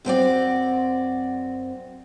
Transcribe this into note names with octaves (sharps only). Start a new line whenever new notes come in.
F#2 C4 F#4 D5